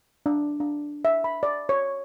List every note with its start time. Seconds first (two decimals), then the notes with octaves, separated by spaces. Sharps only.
0.26 D4
0.60 D4
1.05 E5
1.24 B5
1.43 D5
1.69 C#5